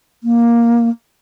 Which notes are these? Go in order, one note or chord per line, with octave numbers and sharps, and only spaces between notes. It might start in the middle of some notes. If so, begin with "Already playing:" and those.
A#3